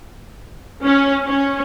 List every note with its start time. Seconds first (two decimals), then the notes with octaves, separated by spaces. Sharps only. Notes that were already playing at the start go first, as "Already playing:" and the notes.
0.84 C#4
1.24 C#4